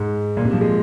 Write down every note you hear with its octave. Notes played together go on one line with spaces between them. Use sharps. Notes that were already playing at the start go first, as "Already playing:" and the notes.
Already playing: G#2
A#2
C3
F3
G#3